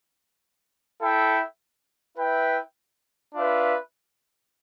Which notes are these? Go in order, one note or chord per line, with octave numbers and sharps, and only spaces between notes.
E4 A4 E5 G5
E4 B4 E5 G5
D4 F4 B4 E5